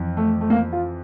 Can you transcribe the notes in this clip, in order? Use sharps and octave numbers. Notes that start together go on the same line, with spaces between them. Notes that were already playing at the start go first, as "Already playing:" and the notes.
Already playing: F2 E3
A3
A3
A#3
F4